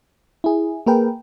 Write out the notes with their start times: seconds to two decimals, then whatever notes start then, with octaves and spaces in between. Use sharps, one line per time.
0.44 E4 G#4
0.86 A#3 G#4 A#4 B4 G5